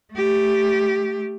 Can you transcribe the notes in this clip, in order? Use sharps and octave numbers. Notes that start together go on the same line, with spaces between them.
A3 G4